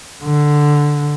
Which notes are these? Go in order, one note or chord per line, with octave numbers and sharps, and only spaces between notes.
D3